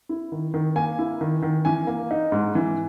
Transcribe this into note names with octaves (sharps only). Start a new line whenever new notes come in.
E4
D#3
D#3
A#3 G#5
E4
D#3
D#3
E3 G#5
A#3
D#4
G#2
E3